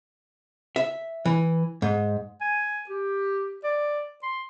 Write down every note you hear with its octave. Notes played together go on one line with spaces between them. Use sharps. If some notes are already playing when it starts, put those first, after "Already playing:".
E5
E3
G#2
G#5
G4
D5
C6